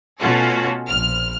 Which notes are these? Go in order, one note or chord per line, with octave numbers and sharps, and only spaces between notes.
B2 A3 C#4 F4 F#4 A4
A#1 F6